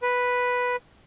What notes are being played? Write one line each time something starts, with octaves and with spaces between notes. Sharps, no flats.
B4